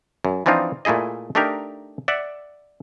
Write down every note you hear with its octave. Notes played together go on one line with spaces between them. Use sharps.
F#2
E3 F3 C4 D4 D#4 F4
A#2 A3 E4 G#4 D#5
A3 D4 D#4 G4 A#4
D5 E5 F#5